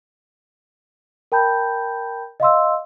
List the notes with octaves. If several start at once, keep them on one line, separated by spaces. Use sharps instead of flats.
A#4 G5 A5 B5 G6
D#5 F5 C6 E6